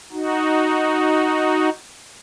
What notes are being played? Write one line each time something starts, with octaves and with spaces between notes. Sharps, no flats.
D#4 F#4